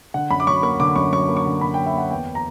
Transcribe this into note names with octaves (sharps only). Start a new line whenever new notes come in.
D3 F#5
F#2 B5
D6
F#3 C#6
A#3 C#6
D3 D6
F#2 C#6
F#3 C#6
A#3
C#6
D3
F#2 B5
G5
F#3
E5
A#3 F#5
E2 G5
A#5